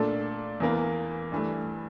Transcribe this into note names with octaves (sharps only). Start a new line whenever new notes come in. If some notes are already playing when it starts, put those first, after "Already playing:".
Already playing: A#2 A3 D4 A4
E2 E3 A#3
G2 E3 A3